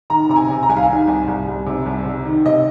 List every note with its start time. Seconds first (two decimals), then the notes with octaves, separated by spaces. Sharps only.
0.10 D#3 A#5
0.29 C3 A#5
0.36 G#5
0.49 C3
0.63 A#5
0.69 C2 G#5
0.76 F5
0.83 G#5
0.88 D#3
1.07 C2
1.28 C2
1.48 C2
1.67 C3
1.86 C2
2.06 C3
2.25 D#3
2.46 C3 D#5